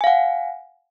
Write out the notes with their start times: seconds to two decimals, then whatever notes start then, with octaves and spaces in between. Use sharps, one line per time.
0.01 G#5
0.04 F5
0.07 F#5